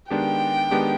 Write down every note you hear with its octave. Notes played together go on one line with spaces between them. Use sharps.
D#3 G#3 B3 D4 G4 G5
D#3 G#3 B3 D4 G4